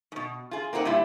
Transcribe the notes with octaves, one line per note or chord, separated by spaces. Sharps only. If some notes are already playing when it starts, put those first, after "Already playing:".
G#2 B2
F4 G#4
A#3 C4 D#4 F#4 F#5
A#2 G3 E4